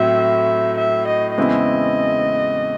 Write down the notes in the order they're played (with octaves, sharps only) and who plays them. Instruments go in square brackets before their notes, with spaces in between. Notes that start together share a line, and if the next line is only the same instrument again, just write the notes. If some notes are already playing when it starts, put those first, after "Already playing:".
Already playing: [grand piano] A2 F#3 C4 [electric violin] E5
[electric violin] E5
D#5
[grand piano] E2 C#3 G#3 C4 E4 [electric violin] D#5